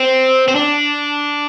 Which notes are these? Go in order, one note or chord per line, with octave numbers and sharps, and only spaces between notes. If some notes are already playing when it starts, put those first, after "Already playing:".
Already playing: C4
C4
D4